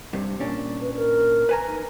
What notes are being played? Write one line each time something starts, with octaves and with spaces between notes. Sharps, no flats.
G2 C3
A#2 C#4 D4
B4
A#4
B4 G#5 A#5
D#4